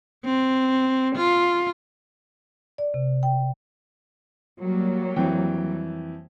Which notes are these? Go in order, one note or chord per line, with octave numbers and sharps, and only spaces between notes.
C4
F4
D5
C3
G5
F#3 G3 A#3
F2 E3 G5